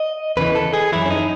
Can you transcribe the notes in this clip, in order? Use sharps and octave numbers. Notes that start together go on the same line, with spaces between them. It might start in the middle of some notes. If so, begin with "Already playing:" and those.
Already playing: D#5
E2 C#3 E3 B4
A4
G#4
F#2 E3 E4
C#4
D#4